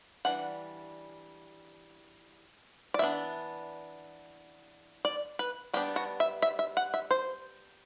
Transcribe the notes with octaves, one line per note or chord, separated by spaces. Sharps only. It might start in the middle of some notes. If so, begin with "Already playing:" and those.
E3 G3 D4 F#5
D5
E3 B3 D4 E5
D5
B4
G3 B3 D4 G4
F#4
E5
E5
E5
F#5
E5
C5